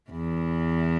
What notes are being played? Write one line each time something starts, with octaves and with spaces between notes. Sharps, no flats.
E2 E3